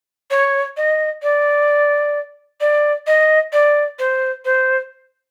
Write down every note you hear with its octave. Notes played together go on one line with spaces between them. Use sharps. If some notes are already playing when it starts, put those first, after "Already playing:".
C#5
D#5
D5
D5
D#5
D5
C5
C5